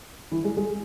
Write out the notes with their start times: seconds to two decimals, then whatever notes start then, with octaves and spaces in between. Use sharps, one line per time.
0.31 E3 E4
0.44 G#3 G#4
0.57 G#3 G#4